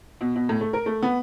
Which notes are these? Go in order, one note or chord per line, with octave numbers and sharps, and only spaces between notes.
B2
B2
A2
A3
A#4
A3
B3